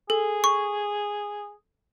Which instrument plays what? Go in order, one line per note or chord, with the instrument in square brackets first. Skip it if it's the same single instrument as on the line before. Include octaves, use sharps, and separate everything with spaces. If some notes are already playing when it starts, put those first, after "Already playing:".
[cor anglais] G#4 [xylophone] A4
[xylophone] C#6